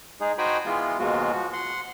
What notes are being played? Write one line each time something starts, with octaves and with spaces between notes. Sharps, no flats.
G#3 D#4 G#4
D#4 F#4 C5 G5 G#5 B5
E3 G#3 B3 F4
D#2 G#2 B2 G#3 F4 F#4
F3 F#4
F#5 C6